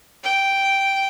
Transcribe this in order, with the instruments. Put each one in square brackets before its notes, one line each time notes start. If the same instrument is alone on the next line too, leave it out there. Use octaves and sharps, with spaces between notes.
[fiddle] G5